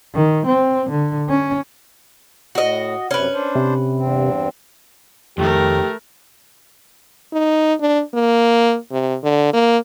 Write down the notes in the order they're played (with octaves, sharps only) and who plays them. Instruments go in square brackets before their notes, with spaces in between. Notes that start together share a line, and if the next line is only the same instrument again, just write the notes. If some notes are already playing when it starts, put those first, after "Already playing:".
[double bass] D#3
C4
D3
C#4
[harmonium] A2 [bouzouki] F#4 D#5
[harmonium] F#2 C3 [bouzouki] C#4 B4
[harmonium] D4 C5
[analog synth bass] C3
[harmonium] E2 G2 C4
[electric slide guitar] F2 D#3 [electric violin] A3 A#4 [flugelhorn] G4
[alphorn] D#4
D4
A#3
C3
D3
A#3